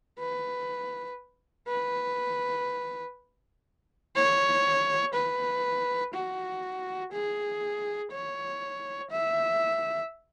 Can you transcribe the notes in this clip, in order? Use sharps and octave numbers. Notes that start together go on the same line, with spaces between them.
B4
B4
C#5
B4
F#4
G#4
C#5
E5